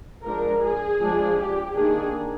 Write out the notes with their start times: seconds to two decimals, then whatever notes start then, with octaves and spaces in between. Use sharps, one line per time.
0.23 F3 G#3 D4 A#4
0.62 G#4
1.00 F3 G#3 D4
1.37 G4
1.75 D#3 A#3 D4 G#4